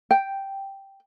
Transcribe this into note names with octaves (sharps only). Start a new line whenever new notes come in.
G5